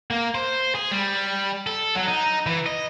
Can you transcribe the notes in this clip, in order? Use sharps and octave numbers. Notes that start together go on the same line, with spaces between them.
A#3
C5
G#4
G3
A4
F#3
D#4
E3
D#5